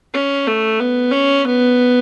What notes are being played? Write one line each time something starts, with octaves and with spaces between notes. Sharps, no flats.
C#4
A3
B3
C#4
B3